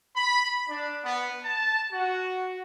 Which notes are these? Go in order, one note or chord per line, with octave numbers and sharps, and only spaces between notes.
B5
D4
B3
A5
F#4